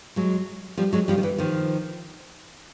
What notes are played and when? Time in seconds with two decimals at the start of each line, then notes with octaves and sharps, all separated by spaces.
0.16 F#3 G#3
0.77 F3 G3
0.93 F#3 G#3
1.08 F3 G3
1.18 D#3
1.23 E3
1.38 D#3 F3